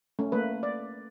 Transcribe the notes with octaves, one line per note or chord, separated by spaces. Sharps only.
A3 C#4
A3 A#3 B4
D5